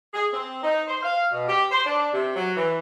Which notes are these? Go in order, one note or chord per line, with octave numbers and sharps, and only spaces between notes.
G#4
C4
D#4
C5
F5
B2
G4
C5
D4
C3
F#3
E3